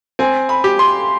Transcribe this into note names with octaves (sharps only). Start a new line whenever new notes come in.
C4 G#5
B5
G4
C6